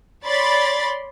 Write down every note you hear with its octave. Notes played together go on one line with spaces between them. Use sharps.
C#5 D5 B5 C6 A6